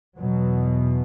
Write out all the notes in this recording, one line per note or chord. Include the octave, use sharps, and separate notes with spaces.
E2 B2 F#3